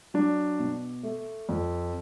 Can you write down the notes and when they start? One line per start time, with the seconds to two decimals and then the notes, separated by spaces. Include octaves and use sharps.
0.14 F#3 D4
0.59 B2
1.03 A3
1.49 F2